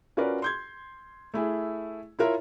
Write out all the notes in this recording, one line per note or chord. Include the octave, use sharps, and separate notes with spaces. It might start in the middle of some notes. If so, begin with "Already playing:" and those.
C#4 F4 F#4 A#4 B4 D5
C6 G6 G#6
A3 E4 G#4
E4 F4 A#4 C#5 E5